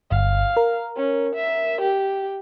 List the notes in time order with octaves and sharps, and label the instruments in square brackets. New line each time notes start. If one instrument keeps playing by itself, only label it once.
[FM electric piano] G1 [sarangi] F5
[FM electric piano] A#4
[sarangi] C#4
E5
G4